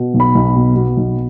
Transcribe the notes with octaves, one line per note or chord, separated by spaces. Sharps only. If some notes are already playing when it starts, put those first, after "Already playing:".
Already playing: B2
B1
B5
B1
B2
B2
B1